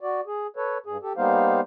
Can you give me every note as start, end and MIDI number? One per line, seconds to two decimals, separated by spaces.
0.01 0.21 66
0.01 0.21 74
0.26 0.47 68
0.56 0.78 69
0.56 0.78 71
0.56 0.78 73
0.86 0.97 43
0.86 0.97 68
1.02 1.13 67
1.02 1.13 69
1.17 1.61 55
1.17 1.61 58
1.17 1.61 59
1.17 1.61 63
1.17 1.61 72
1.17 1.61 77